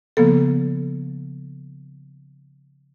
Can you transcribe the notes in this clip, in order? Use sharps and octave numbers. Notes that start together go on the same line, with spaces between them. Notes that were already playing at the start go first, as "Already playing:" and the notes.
C#3 F3 A#3 B3 A4